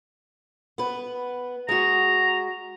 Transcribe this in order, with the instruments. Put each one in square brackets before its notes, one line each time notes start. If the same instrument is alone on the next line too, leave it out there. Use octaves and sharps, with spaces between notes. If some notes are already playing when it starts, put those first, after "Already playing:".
[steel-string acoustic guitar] B3 B4
[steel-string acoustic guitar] G#3 F#4 [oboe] A#5